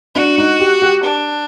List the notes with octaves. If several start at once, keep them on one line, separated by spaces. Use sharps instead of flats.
D4 F#4
D#4
G4
G4
D4